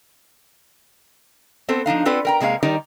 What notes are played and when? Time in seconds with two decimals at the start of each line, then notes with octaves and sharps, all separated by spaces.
1.68 B3 C4 A4 C5
1.86 F3 D4 D#4 F5
2.05 C4 F4 A4 B4 D5 F#5
2.25 A#4 G5 A#5
2.41 C3 G#3 A#3 D#4 F5
2.63 D#3 G3 D#4 G4 A#4 D5